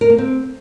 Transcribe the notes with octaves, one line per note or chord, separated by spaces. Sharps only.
A#4
A#3
C4